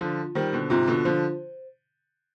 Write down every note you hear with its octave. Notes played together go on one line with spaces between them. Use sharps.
D3 F3 F4
D#3 G3 C5
B2 D3
G#2 C3 F4
B2 D3
D3 F3 C5